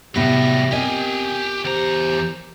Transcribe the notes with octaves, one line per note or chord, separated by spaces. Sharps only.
A2 C3 F#3 G3 B3 E5 A#6
C4 G4 A#4 D#5 G#5
E2 G4 C5 A#5